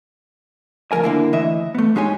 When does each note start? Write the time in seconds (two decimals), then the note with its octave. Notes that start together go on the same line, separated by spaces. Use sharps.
0.92 D2 G2 F3 A#4 G#5
1.03 D3 A#3 E4
1.33 D2 E3 D#5 E5
1.75 A3 B3
1.95 G#2 G#3 D#4 G4 C#5 G#5